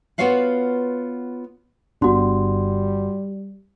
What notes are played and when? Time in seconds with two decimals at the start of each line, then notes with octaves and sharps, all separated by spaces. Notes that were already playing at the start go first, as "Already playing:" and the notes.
0.18 B3 F4 F#4 C#5 F5 F#5
2.02 G1 G3 B3 D4 F#4 F#5 C6